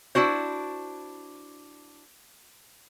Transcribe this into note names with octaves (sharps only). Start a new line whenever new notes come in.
D4 E4 F#4 C5